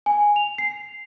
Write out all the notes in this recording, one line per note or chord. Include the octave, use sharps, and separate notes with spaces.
G#5
F7
C7